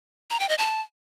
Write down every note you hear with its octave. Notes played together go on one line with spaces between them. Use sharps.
A#5
G5
D#5
A5